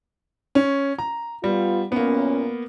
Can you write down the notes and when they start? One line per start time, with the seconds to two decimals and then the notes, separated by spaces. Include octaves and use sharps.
0.55 C#4
0.98 A#5
1.44 G3 B3 F4
1.92 F#2 A#2 A#3 B3 C#4